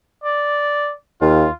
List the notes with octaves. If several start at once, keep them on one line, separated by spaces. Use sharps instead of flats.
D5
D#2 F4